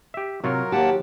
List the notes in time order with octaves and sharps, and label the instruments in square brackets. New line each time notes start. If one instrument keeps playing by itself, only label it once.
[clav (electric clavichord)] G4 E5
[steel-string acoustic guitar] C3 [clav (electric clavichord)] F#3 F4 C#5 [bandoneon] A#4
[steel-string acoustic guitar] D#2 G4 [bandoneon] A#3 F#5 A5